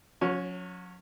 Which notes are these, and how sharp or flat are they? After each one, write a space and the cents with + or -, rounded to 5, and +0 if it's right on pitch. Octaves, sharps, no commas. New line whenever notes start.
F#3 -40 C#4 +0